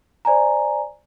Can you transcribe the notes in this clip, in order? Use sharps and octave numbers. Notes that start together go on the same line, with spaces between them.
C5 D5 G#5 A#5